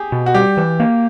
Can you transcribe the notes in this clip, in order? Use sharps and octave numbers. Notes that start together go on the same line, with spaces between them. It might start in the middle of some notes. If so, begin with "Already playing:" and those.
Already playing: G4 G#4
B2
F#4
G3 G4
E3
A#3